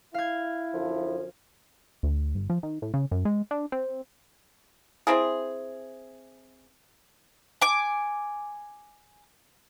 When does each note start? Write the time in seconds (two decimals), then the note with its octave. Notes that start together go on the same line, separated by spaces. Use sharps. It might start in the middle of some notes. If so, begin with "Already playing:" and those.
0.14 E4 F5 G#6
0.74 F#2 D3 F3
2.03 D2
2.35 G1
2.50 F3
2.63 D#3
2.82 A2
2.94 C#3
3.11 F#2
3.25 G#3
3.51 D4
3.72 C4
5.07 C4 E4 G#4
7.62 G#5 D6